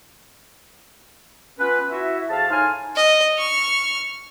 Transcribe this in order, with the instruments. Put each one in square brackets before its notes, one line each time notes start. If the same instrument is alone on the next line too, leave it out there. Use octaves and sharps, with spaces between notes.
[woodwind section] B3 C#4 F4 B4
E4 F#4 E5
F2 G#4 F5 A5
A2 D#4 G#5 C6 F6
[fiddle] D#5
C#6 F6